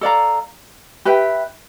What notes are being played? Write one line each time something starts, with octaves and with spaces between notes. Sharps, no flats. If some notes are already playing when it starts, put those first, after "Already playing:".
A4 D5 F5 A#5
G4 B4 E5 G5